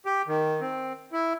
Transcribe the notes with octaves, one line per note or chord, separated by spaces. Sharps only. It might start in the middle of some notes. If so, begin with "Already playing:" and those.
G4
D#3
C4
E4